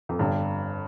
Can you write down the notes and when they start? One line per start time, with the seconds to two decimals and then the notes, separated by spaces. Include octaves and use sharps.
0.09 F2
0.19 G1 G2